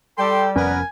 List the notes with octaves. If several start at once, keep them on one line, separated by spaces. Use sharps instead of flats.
G3 A4 G5 C6
F1 F2 B3 C#4 A#4 B4 G#5